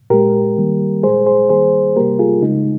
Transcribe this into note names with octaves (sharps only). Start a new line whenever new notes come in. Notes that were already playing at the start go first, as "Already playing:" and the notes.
A#2 G#3 G4 A#4
D#3 G3 A#3
A#2 G#3 G#4 C5
G#4 C5
D#3 G3 A#3 G#4 C5
C3 G3 A#3 G4 A#4
F4 G#4
C#3 G#3 D#4